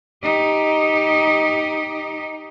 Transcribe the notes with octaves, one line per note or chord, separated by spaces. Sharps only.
D#4 G4